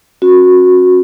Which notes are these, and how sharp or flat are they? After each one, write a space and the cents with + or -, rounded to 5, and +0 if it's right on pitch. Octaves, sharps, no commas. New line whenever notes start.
C#4 -40 F#4 -20